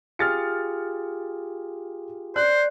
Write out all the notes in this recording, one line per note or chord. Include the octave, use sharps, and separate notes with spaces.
F4 G4 G#4 F6 A6 C#7
C5 D5 F#6